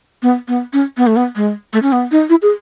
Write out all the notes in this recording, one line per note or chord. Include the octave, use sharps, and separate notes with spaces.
B3
B3
C#4
B3
A3
B3
G#3
A3
C#4
B3
D#4
E4
G#4